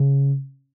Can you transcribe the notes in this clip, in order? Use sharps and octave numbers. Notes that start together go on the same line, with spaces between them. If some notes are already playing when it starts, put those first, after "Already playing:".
Already playing: C#3